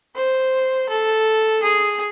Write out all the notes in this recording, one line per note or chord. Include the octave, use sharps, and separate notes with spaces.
C5
A4
G#4